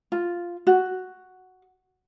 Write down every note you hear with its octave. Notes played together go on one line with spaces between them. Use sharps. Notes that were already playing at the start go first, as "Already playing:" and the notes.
F4
F#4